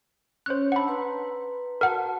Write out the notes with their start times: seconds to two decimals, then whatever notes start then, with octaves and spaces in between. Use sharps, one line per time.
0.46 C#4 C5 C#5 F#6
0.72 D4 F#5 A5 B5 E6
0.88 B4 A#5 C6
1.81 F#4 A#4 F#5 A5